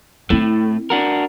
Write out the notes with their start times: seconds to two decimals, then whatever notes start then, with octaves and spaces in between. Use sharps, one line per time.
0.30 A2 A3 C4 E4
0.90 D4 F#4 A#4